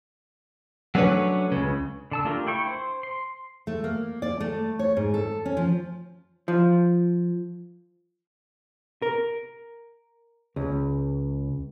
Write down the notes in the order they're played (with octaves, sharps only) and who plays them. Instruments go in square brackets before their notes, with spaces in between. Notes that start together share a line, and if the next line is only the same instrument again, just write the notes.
[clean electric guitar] F#3 A3 C#4 D4 B4 C#5
C#2 C#3
[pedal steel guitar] D3 A5 E6
A3 D4 F4 G4 A#4
E4 G5 C#6
C5
C6
[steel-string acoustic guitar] A3
A#3
D5
A3
C#5
G#2
A4
C#4
F3
[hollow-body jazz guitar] F3
A#4
C#2